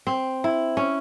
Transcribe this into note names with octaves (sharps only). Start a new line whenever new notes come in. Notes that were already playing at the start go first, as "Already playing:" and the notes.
C4
E4
C#4